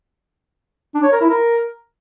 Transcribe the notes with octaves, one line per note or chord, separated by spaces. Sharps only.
D4
C#5
A#4
E4
A#4